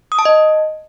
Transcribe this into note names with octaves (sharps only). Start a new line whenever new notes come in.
D#6
A5
D#5